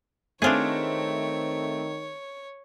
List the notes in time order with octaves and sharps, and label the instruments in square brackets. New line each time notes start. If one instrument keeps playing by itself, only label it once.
[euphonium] D#3 [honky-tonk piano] A3 C4 [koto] D4 F4 G#4 [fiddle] C#5